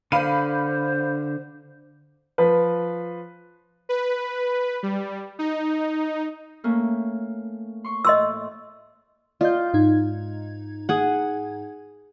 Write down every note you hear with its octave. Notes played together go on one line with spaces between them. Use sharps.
D3 C5 F5 B5 D#7
F3 B4
B4
G3
D#4
A3 A#3 C#4
C6 C#6
A2 D#5 C6 E6
F4 D5 D#5 G6
G#2 D#4 G#6
G#4 F#5